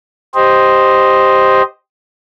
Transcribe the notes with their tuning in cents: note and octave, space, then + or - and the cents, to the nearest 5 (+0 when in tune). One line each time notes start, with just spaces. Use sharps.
G4 +0 C5 +0 D#5 +0